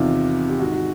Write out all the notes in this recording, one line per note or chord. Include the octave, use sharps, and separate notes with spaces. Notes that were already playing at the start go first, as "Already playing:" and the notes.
Already playing: E2 C3 D#3 F4
G4
G#2 D#3 F#4
F#4